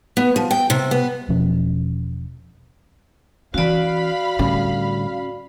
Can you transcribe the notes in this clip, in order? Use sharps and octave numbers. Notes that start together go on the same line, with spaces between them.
B3
F3
G5
C3
B3
E1 B2 F3 C#4
E3 C#4 F#4 D5 F5 B5
A2 D3 G3 C#4